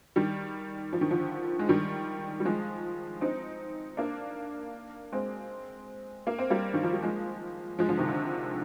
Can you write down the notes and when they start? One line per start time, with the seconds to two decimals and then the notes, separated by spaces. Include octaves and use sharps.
0.16 D#3 G3
0.93 F3
1.01 D#3
1.10 D3 F3
1.59 G#3
1.69 D#3 G3
2.40 G3
2.45 F3 G#3
3.21 C4 D#4
3.97 A#3 D4
5.12 G#3 C4
6.27 A#3
6.39 C4
6.50 G3 A#3
6.74 D#3
6.83 F3
6.93 G3
7.02 F3 G#3
7.79 F3 G#3
7.89 D3 F3
7.98 C3 D#3
8.08 D3